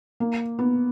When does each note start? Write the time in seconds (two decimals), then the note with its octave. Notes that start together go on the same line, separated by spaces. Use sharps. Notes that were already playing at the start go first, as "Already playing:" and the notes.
0.20 A#3
0.59 B3